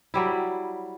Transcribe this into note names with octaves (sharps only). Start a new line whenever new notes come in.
F#3 G3 E4